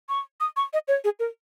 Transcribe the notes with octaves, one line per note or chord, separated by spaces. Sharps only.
C#6
D#6
C#6
D#5
C#5
G#4
A#4